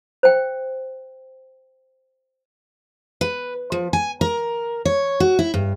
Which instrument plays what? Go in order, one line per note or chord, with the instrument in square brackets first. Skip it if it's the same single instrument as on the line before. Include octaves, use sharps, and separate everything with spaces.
[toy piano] C5 G5
[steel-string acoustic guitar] B4
F3
G#5
A#4
C#5
F#4
E4
G2